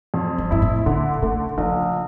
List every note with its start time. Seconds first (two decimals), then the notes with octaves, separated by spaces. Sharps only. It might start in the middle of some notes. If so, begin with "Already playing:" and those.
0.14 F2
0.38 G2
0.51 G2 E4
0.62 A2
0.86 A#2 D3
1.22 C#3 A3
1.58 A#1 C#3